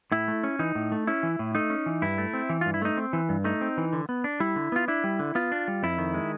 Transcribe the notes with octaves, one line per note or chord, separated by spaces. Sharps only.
A2 E4
A3
C#4
E3 D#4
A2
A3
C#4 E4
E3
A2
A3 D#4
C#4
E3
G2 E4
A3
C4
E3
G2 F4
E4
A3 D#4
C4
E3
G2
A3 D#4
C4
E3
D3
B3
D4
G3 E4
D3
B3 F4
D4 E4
G3
D3
B3 F4
D4
G3
F2 E4
D#3
G#3